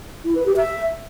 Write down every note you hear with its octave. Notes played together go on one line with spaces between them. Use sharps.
E4
B4
G4
E5